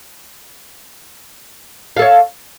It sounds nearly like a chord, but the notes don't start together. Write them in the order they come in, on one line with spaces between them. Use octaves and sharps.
F5 A4 C#5